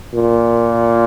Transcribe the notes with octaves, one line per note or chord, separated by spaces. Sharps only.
A#2